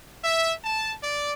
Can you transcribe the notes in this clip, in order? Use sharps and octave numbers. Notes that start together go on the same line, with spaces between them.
E5
A5
D5